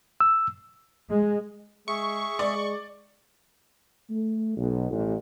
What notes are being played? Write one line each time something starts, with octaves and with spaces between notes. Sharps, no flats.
E6
G#3
G#3 G#4 E5 C#6
G#3 D5
A3
B1
A1